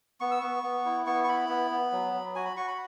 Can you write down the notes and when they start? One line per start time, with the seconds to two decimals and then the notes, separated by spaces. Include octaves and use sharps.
0.20 B3 C#6
0.31 E6
0.41 B3 C#6
0.63 B3
0.85 E4
1.06 B3 C#6
1.24 C#6
1.28 E4 B5
1.49 B3
1.71 B3
1.92 F#3
2.14 F#3
2.35 F#4 G#5
2.45 B5
2.57 F#4 C#6
2.68 B5